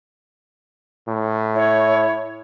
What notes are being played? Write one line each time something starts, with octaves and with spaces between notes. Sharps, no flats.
A2
E4 C#5